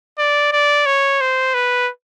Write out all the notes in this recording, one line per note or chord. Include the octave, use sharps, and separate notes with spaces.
D5
D5
C#5
C5
B4